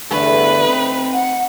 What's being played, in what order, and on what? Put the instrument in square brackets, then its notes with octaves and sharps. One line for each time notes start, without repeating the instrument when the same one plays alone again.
[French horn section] E2 G2 D3 [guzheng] A3 [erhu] B4
[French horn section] C4 [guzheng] D#4
[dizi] F#5